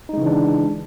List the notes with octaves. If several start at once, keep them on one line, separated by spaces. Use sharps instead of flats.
C#3 E3 G#3 D4 D#4